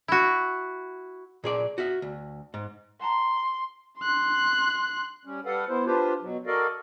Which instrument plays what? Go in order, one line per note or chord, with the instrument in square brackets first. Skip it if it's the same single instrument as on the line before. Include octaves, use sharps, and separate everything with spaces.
[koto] E4 F#4
[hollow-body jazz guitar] A#2 G#4 D5
F#4 E5
D2
G#2
[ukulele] F#5 A5 A#5 [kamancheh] C6
[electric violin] C6 F#6
[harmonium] G3 C#4
G3 A4 B4 F5 F#5
B3 E4 C5
D4 F4 G4 B4 C5
B2 F#3
F#4 A4 A#4 D5 D#5 F5